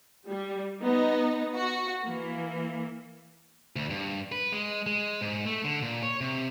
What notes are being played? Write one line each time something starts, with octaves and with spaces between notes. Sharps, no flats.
G3
B3 D#4
F#4
E3 A#3
D2
G2
B4
G#3
G#3
G#2
A3
D3
A#2
C#5
C3